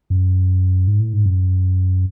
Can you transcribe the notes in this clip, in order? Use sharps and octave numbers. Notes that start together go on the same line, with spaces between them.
F#2
G#2
A2
G#2
F#2